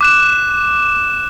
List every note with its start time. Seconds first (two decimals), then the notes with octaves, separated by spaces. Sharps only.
0.01 D6 F#6 E7